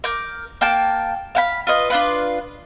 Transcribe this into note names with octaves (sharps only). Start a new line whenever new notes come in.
A#4 D6 G6
A#3 G5 A5
F5 F#5 B5
F4 B4 D#5
D4 F4 B4